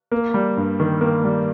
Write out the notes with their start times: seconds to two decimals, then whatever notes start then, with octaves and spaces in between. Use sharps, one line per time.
0.11 A#3
0.34 G3
0.57 G2
0.80 D#3
1.01 A#3
1.24 G3